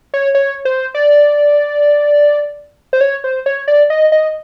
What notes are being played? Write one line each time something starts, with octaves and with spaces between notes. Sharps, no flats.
C#5
C#5
C5
D5
C5
C#5
C5
C#5
D5
D#5
D#5